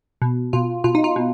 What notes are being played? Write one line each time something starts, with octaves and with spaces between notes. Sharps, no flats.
B2
B2 F4
B2 F4
D#4
F4
B2